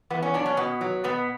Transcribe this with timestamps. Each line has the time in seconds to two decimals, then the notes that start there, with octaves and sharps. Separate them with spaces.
0.10 E2 B3
0.22 C#4
0.34 B2 F#3 D4
0.46 C#4
0.57 B2 B3
0.81 F#3
1.04 B2 B3